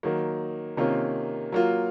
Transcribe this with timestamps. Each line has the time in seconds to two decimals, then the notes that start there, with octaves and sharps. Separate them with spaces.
0.03 D#3 F#3 A#3
0.77 C3 D#3 A#3 C#4 F4
1.52 F#3 A#3 F4